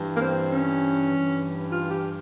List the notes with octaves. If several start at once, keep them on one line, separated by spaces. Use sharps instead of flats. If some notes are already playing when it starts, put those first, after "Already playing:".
Already playing: G2 E3
A#3
C4
C#4
G2 E3
F4
G4